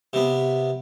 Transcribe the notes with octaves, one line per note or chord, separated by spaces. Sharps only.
C3 B3